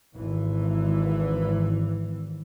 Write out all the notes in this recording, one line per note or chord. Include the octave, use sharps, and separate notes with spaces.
G#1 E3